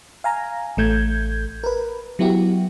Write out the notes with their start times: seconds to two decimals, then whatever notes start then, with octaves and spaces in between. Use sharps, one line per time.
0.24 F5 G#5 A#5
0.77 A1 A3 G6 G#6
1.64 A#4 B4
2.19 F#3 B3 E4 F#4 G4